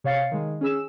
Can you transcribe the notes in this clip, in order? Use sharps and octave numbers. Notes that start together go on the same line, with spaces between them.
C3 C#5 F5 A6 C7 C#7
D#3 G#3
C#4 G#4 E6 E7